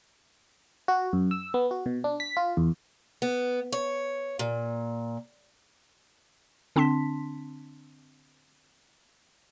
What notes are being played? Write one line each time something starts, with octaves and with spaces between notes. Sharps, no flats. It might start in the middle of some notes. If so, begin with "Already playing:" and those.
F#4
F#2
E6
B3
F#4
B2
D4
B6
F4
E2
B3
C#5
A#2
D3 C4 D4 A5 C6 B6